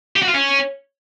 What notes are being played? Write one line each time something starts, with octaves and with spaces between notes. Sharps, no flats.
G4
F#4
F4
C#4